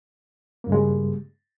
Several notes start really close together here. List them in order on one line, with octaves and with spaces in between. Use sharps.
A#3 G2 C#3 G#3 G3